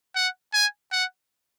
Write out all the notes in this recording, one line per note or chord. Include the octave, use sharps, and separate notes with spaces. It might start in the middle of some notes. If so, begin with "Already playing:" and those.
F#5
G#5
F#5